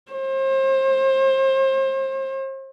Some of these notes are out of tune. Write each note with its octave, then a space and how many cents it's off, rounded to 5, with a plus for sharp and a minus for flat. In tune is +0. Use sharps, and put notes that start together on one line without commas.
C5 +35